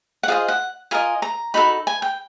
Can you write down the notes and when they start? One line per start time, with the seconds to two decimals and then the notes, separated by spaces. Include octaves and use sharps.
0.23 F#5
0.28 F4 G#4 C5 D#5 F5
0.48 F#5
0.91 F4 A#4 D#5 G#5
1.22 A#5
1.54 D#4 F#4 A4 B5
1.87 G#5
2.02 G5